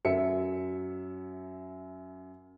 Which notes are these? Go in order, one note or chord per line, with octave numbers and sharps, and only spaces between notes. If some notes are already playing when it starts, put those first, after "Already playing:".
F#2 F#3 E5 C#7